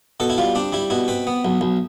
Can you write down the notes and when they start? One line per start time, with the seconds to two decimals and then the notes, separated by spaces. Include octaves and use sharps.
0.20 B2 A4
0.30 E4
0.38 G3 F4
0.55 C4 D4
0.72 G3 E4
0.90 B2 E4
1.08 C4 B4
1.27 B3
1.45 B1
1.61 B1